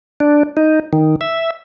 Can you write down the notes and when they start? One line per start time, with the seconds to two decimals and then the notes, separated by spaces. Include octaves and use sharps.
0.20 D4
0.57 D#4
0.93 D#3
1.21 E5